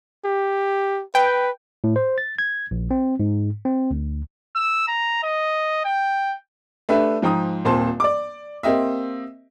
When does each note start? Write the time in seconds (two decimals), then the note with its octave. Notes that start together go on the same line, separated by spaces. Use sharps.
0.25 G4
1.15 B4 G5
1.84 A2
1.96 C5
2.18 A6
2.39 G#6
2.71 A#1
2.91 C4
3.20 G#2
3.65 C4
3.91 D2
4.56 E6
4.88 A#5
5.23 D#5
5.85 G5
6.89 A3 D4 G4 B4 E5
7.22 G#2 F3 G5 A#5 D#6
7.65 D#1 A#2 C4 C5 A5 C6
8.00 D5 D6
8.63 A#3 C4 G4 D#5 E5